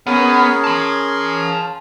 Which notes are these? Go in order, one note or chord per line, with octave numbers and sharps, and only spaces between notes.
B3 C#4 G#4 A#4
A5 C6